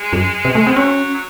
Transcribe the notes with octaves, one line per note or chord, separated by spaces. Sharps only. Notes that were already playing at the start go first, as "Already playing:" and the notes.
Already playing: G#3
F#2
C3
A3
C4
F#3 C#4
F#3